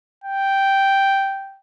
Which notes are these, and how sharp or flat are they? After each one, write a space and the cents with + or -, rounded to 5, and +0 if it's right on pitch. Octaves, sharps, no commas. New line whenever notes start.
G5 -5